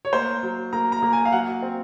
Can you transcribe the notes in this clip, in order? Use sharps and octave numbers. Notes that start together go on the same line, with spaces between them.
C#5
A#3 C5
F#3
A#3 A#5
A#5
A#3
G#5
F5
F#3 F#5
C4